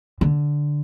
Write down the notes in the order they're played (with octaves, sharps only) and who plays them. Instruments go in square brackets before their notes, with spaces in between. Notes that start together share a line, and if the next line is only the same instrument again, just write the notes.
[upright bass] D3